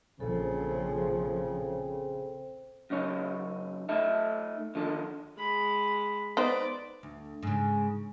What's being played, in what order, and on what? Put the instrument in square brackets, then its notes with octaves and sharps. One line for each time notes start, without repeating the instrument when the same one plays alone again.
[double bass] A#1 F3 [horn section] C#3 [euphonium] C4 [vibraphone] A4
[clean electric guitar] F#2 C#3 D#4 C#5
A3 D#4 A4 E5
D3 D#3 F3 A4
[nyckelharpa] G#3 B5
[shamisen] B3 D#4 C5 [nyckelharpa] B4 D5
[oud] D2
G#2 C#3